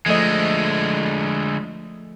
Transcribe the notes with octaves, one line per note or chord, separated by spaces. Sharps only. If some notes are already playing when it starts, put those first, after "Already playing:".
D3 F3 G#3 A3 D#5